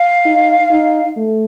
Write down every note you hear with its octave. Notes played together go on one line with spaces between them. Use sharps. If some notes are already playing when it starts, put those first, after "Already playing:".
Already playing: F5
D#4
D#4
A3